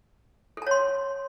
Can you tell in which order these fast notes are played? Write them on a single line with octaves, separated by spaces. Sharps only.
A4 A5 C#5 C6